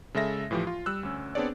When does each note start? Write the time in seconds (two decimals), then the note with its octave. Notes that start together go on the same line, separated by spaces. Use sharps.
0.14 C#3 G#3 A4 E5 A#6
0.51 A2 E3 F3 F4 G4
0.67 F4
0.86 G3 E6 F#6
1.03 D2 C#4
1.35 B3 C4 D4 G#4 C#5 D5